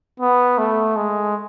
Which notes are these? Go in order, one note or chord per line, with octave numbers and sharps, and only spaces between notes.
B3
A3
G#3